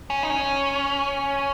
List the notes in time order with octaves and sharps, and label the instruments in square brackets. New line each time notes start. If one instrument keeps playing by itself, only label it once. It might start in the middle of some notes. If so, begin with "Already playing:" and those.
[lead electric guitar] C#4
D#4
C#4